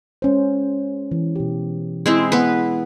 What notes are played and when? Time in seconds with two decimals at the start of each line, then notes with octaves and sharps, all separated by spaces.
0.22 G#3 C#4 C5
1.11 E3
1.36 B2 G4
2.06 G#3 C4 E4 G#4
2.32 B3 B4